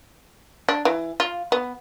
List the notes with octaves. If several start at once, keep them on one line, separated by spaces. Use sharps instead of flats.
D4
E3
F4
B3